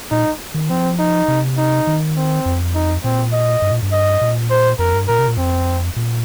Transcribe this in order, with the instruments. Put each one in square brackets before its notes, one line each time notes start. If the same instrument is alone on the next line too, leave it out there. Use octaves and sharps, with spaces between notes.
[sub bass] A#2 [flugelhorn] D#4
[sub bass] D#3
[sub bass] F3 [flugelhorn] C4
[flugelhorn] D#4
[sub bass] C3
[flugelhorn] D#4
[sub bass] D#3
[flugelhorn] C4
[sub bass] F2
[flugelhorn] D#4
[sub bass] A#2 [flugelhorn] C4
[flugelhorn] D#5
[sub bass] G2
A#2
G2
[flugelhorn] D#5
[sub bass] A#2
[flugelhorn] C5
[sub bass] F2 [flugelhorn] A#4
[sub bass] G2
[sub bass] A#2 [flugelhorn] A#4
[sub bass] C3
A#2
[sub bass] F2 [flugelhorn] C4
[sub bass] A#2